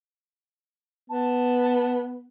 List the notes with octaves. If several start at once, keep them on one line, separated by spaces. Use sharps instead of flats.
B3 A5